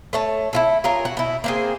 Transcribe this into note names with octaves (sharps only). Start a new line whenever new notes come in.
A3 C#5 A5
E4 F4 A4
F4 G#4 A#4 C#5
F#4
B2 E4
A#3 C4 G#4